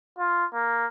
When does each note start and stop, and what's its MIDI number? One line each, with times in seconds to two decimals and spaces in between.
0.19 0.45 65
0.54 0.86 58